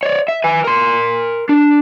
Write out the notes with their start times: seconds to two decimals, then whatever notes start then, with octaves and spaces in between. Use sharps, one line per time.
0.03 C#5 D5
0.28 E5
0.44 B4 G#5
0.65 A#4 C6
1.49 D4